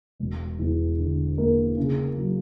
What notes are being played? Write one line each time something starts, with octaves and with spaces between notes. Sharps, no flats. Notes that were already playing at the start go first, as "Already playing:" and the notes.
E1
E2
D3
A#3
C#3
F#3